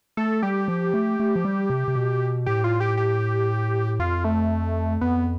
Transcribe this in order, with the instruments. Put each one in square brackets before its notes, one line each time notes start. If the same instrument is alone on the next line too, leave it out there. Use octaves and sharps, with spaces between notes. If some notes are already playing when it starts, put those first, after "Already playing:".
[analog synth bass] A3 [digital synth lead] A4
[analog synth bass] G3 [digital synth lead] G4
[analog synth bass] F3
A3
A3
F3
G3
C3
C3
B2
[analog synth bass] A2 [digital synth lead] G4
[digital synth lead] F4
G4
G4
[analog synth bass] F2 [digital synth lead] F4
[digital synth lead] A3
[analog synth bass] F2 [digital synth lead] B3